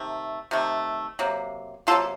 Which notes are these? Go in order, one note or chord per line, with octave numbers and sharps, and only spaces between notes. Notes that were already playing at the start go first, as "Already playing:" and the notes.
Already playing: C3 D#3 A3
C3 D#3 A3
C3 F#3 A#3
C3 F#3 A#3 F4 A4